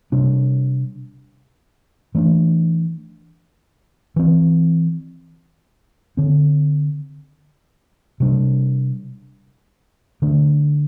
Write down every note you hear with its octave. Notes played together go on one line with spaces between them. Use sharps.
C3 G3 D4
E3 A3 D4
E3 C4
D3 C4
C3 G3 D4
D3 A3 D4